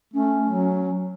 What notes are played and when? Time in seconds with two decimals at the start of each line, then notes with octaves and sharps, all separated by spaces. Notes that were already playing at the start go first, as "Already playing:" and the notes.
0.13 A3 C#4
0.45 F#3